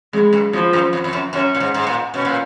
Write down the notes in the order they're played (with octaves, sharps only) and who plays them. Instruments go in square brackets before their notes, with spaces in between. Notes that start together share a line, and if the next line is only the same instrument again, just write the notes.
[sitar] F2 [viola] G#3
[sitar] F#2
[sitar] F2 [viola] F3
[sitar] F#2
F2
F2
F#2
[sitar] F#2 [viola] C#4
[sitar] A#2
G#2
G#2
A#2
[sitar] B2 [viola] C#4
[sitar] A#2